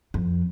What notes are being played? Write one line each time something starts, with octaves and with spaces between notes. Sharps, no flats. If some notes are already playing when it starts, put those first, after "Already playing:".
F2